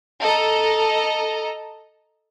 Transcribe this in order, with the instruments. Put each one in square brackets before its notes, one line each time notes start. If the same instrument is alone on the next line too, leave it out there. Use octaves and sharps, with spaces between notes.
[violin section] A4 D#5 A#5